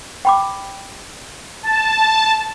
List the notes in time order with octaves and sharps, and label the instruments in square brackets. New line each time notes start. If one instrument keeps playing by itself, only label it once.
[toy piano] G5 B5 D6
[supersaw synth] A5